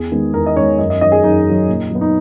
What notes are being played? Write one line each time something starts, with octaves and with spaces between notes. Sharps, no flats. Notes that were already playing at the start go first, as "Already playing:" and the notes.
Already playing: E2 G#4
D#3 G#3 B3
E2 A#4
D#5
D#3 G#3 B3 C#5
F#2 D#5
D#5
D#3 F#3 D#5
G#4
F#2 D#4
D#3 F#3
A#2
F#3 B3
D#4